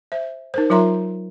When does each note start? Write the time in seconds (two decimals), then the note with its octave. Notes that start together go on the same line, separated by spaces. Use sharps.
0.12 C5 E5
0.54 D#4 A#4 C5
0.70 F#3 F4 A#4 E5 A#5 C6